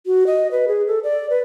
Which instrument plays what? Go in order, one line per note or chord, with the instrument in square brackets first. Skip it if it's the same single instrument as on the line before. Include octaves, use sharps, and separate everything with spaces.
[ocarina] F#4
D#5
B4
G#4
A4
D5
B4